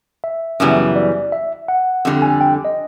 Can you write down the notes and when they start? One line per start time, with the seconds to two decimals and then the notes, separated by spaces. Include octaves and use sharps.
0.24 E5
0.60 F#2 C#3 E3 G3 B3
0.96 D5
1.32 E5
1.68 F#5
2.05 F2 D3 G3
2.22 G#5
2.41 G5
2.65 D#5